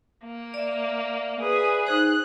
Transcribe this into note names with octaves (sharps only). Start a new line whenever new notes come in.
A#3
D5 E5
G#4 B4
D#4 G#4 C5 F#6